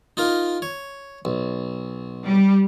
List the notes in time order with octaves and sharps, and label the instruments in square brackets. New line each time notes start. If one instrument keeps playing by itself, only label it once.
[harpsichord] D#4 F4 A#4
C#5
B1
[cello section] G3